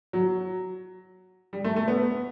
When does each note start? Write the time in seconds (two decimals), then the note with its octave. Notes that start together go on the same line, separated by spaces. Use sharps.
0.13 F#3
1.53 G3
1.64 A3
1.76 A3
1.88 B3